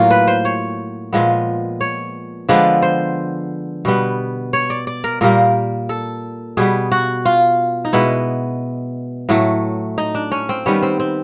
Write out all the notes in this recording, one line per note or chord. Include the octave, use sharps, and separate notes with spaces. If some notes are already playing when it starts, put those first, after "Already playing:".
Already playing: A2 F#3 A#3 F4
B4
C5
C#5
A#2 F3 G#3 B3
C#5
D3 F3 G#3 B3 D5
C5
B2 G3 B3
C#5
D5
D5
A#4
A#2 G3 A#3 A#4
A4
B2 G3 B3 G#4
F#4
F4
D#4
B2 G#3 B3 E4
A2 F#3 A3
D#4
D4
C#4
C4
D#3 G3 B3 C#4
C4
C4